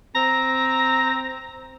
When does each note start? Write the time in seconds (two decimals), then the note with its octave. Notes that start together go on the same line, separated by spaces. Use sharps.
0.15 C4 A#5